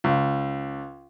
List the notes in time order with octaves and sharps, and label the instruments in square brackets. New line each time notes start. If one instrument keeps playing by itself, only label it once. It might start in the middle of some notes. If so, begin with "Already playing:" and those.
[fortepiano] C#2